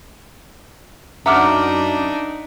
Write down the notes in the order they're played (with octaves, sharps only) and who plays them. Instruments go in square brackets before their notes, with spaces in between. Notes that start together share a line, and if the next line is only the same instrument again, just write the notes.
[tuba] F#2 [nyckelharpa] D4 D#4 [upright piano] E5 F#5 [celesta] A#5 D6 F6